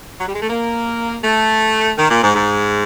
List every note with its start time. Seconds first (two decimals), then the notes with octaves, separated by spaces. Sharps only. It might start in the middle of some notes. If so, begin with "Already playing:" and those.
0.19 F#3
0.26 G3
0.34 G#3
0.41 A3
0.49 A#3
1.23 A3
1.97 D#3
2.10 A#2
2.22 G#2
2.35 G#2